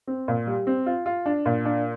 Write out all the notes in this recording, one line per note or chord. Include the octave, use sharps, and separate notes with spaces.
C4
A#2
G3
C4
F4
F4
D4
A#2
D4